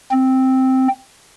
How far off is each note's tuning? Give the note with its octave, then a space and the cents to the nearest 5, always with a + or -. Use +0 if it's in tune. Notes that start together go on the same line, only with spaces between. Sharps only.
C4 +0